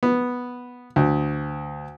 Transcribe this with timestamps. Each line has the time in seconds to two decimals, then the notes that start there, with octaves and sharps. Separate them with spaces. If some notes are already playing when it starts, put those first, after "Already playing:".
0.03 B3
0.96 D2